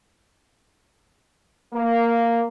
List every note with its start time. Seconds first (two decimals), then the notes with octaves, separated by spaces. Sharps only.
1.74 A#3